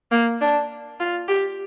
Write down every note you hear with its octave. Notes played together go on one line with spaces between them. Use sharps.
A#3
D4
F4
G4